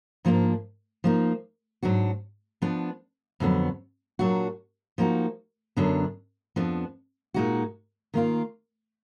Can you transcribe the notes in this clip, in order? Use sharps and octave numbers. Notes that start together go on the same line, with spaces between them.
G#2 F3 A#3 D4
F3 A#3 D#4
G#2 F#3 D4 F#4
F3 B3 D4
F2 D3 F#3 B3
A#2 F#3 D4 F#4
F3 A#3 D#4 F#4
F#2 D3 F#3 B3 D4
F2 F3 B3 D4
A#2 G#3 D#4 F#4
D#3 A#3 F4